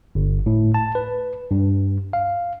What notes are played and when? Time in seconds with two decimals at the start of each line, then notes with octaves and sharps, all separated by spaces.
0.15 G1
0.46 A2
0.74 A5
0.95 B4
1.51 G2
2.13 F5